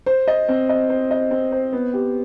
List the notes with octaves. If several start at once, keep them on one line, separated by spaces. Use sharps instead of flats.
C5
D#5
C4
D#5
C5
D#5
C4
C5
B3
G4